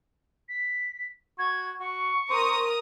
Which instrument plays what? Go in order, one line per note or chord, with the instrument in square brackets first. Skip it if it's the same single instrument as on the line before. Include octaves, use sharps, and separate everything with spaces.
[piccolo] B6
[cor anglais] F#4 [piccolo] G#6
[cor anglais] F#4 [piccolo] C#6
[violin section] A#4 A#5 D#6 [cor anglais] C5